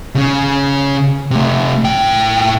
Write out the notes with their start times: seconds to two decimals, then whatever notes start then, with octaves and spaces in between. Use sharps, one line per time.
0.15 C#3 C#4
1.31 C3 A3
1.84 A2 G5